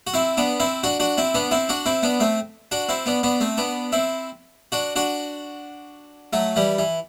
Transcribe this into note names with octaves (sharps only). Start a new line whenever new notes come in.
F#4
C4 E4
B3 D4
C4 E4
D4 F#4
D4 F#4
C4 E4
B3 D4
C4 E4
D4 F#4
C4 E4
B3 D4
A3 C4
D4 F#4
C4 E4
B3 D4
B3 D4
A3 C4
B3 D4
C4 E4
D4 F#4
D4 F#4
F#3 A3
E3 G3
E3